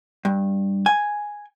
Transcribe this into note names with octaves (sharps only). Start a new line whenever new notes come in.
G2
G#5